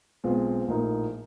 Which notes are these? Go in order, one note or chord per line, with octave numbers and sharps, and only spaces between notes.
B1 B2 G#3 C4 F4
A#1 A2 F3 A#3 D#4